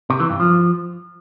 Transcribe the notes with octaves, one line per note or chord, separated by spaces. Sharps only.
C3
E3
G2
F3